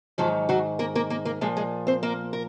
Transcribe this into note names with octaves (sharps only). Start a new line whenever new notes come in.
G#2 D#3 F3 F#3 F4
F#3 F#4
A#3 A#4
A#3 A#4
A#3 A#4
A#3 A#4
A#2 F3 G#3 G#4
G#3 G#4
C4 C5
A#3 A#4
A#4